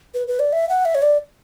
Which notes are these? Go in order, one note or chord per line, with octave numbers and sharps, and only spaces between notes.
B4
B4
D5
E5
F#5
E5
C#5
D5